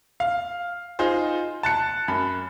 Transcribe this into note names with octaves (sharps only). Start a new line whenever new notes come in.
F5
D#4 F4 G#4 C5
A5 F#6 C#7
F#2 B5